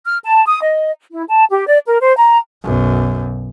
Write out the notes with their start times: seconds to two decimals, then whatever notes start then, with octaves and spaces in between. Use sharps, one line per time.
0.05 F6
0.23 A5
0.45 D#6
0.62 D#5
1.10 E4
1.27 A5
1.50 G4
1.67 D5
1.85 A#4
2.00 C5
2.17 A#5
2.63 B1 F#2